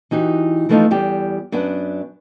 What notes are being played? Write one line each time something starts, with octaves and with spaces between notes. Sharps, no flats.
E3 D#4 F#4 G4
E3 F3 A3 B3 D#4 F4
E2 G3 G4
F#2 B3 D4 B4 F#5